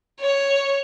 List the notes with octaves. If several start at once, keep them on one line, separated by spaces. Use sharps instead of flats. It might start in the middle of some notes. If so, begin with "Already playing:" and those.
C#5